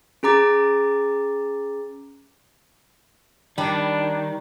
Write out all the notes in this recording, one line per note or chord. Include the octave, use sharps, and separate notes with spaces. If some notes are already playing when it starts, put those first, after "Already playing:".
C#4 G#4 A#5 D6 A6
D#3 G3 D4 B5